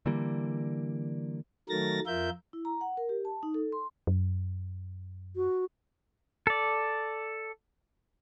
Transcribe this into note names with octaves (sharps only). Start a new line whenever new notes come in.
D3 E3 G3 A#3
D#3 F#3 A3 A#4 A6 A#6
F2 F4 A#4 E5 G6
E4
A#5
F#5
A#4
G4
A5
D#4
A4
C6
F#2
F#4
A4 D5